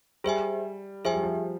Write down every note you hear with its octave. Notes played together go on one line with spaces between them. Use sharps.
G3 G#4 C5 E5 G#5
F3 G#4 C5 E5 G#5
G3
F3